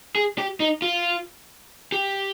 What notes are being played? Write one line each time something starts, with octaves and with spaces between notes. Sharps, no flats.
G#4
G4
D#4
F4
G4